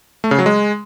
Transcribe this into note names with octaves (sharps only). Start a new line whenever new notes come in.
A3
C#3
F#3
G#3